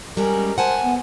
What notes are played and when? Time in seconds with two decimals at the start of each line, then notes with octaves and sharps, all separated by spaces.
0.17 G3 G#3 C#4 A#4
0.58 C5 F#5 G#5 A5
0.83 B3